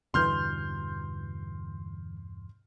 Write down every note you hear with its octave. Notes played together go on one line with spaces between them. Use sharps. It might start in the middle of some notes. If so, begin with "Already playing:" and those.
E2 G2 B2 D3 E3 C6 F6 G6